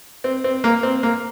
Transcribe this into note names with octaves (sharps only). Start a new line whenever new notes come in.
C4
C4
A#3
C4
A#3